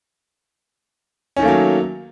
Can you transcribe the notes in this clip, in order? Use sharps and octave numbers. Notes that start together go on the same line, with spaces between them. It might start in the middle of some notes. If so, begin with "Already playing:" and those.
D#3 F#3 A3 A#3 C#4